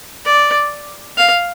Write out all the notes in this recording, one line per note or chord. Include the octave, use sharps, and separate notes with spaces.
D5
F5